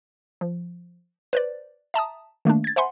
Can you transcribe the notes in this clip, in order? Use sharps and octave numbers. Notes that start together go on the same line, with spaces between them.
F3
B4 C5 D5
E5 A5 A#5 D#6
D#3 A3 A#3 D4
G#6 A6
C5 E5 F#5 G#5 B5 C6